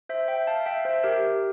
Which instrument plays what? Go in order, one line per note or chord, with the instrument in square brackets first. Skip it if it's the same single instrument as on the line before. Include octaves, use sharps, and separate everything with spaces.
[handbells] C5 E5
E5 G5
F5 A5
E5 G5
C5 E5
G4 A#4